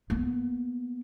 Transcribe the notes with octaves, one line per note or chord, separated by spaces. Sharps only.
A#3 B3